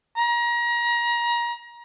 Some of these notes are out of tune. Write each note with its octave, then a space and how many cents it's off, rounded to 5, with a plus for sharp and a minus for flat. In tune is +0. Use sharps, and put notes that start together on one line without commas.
A#5 +30